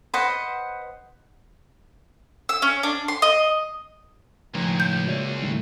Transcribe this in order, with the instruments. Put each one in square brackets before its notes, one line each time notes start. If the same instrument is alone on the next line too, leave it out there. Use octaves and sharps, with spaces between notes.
[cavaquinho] B4 C5 D#5 F#5
[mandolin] E6
C#4
D4
C6
D#5
[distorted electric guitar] C#2 [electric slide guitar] A2 D#3 F3 [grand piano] G5 A#5 C6
[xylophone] G6
[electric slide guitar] G#3 A#3 E5 [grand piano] F#4 C#5 D5
[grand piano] D#2 A2 D#3 [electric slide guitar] G3 A3